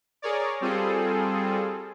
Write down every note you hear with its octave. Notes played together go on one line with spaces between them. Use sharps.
G#4 A#4 C#5 D5
G3 C4 F4 G#4 A4